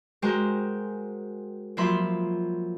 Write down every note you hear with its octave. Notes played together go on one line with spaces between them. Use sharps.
G#3 F#4 G4 A#4 C5
F3 F#3 A#3 E5 B5 C6